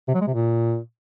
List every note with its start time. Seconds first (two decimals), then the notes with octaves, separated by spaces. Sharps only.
0.08 C3
0.15 F#3
0.21 G#3
0.28 C3
0.34 A#2